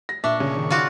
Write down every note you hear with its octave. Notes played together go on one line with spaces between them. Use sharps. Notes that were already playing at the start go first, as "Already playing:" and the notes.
A#6
A#2 D4 E5 C#6
C#3 C#4
D#3
F4 F#4 D5